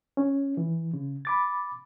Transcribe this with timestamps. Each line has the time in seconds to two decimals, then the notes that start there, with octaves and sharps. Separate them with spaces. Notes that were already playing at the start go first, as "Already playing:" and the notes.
0.17 C#4
0.57 E3
0.93 C#3
1.25 B5 D6 A6